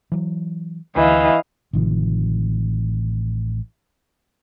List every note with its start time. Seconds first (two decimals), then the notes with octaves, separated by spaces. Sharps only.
0.12 E3 F#3
0.96 D2 E3 D#5 F5
1.73 A1 C3 D#3 F3